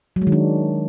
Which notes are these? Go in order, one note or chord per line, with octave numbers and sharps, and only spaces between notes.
F#3
G#3
D#3
D4